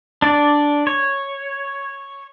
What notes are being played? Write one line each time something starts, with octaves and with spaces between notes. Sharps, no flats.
D4 D5
C#5